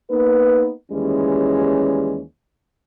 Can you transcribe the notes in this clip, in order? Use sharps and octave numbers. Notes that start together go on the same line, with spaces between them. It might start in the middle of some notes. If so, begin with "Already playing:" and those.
A#3 B3 D#4 B4
D#2 E3 G3 G#3 C#4